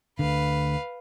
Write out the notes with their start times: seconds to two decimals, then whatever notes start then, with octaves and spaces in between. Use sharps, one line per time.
0.19 D2 D3 B4 F5